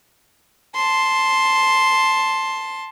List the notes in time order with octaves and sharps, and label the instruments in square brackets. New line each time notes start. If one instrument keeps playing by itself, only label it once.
[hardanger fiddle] A5 C6